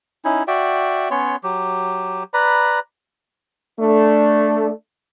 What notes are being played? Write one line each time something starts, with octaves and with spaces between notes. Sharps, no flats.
C#4 D#4 E4
F#4 D5 E5 G5
B3 C#4 C#5 C6
F#3 G4
B4 D5 A#5 B5
A3 D4